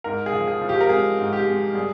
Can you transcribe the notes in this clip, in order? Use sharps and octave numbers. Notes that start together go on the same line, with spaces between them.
G#2 A#4
G#4
F3
G#4
F3
G4
A#4
G#3 G#4
G#2
G4
G#3
G3 G#4